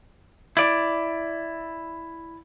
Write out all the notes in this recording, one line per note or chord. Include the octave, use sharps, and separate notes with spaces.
E4 D5